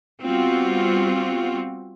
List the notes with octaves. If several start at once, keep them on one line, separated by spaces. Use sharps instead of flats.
G3 B3 C4 F4 F#4